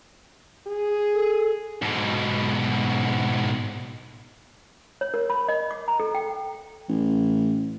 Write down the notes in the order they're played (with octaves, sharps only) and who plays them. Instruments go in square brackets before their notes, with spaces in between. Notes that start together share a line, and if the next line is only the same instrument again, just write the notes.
[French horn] G#4
[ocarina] A4
[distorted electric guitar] G#2 B2
[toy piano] C#5
A#4
B5
D#5
D6
A#5
A4
G5
[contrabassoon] A1